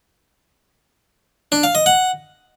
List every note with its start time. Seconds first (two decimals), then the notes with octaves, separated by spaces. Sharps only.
1.52 D4
1.63 F5
1.75 D#5
1.86 F#5